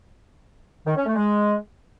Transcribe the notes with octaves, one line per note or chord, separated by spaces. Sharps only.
D#3
C#4
A3
G#3